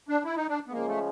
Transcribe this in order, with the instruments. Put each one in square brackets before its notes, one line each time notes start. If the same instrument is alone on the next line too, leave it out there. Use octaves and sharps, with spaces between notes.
[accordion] D4
E4
D#4
D4
B3
[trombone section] C#3 F3 G#3 [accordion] A#3
[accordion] A3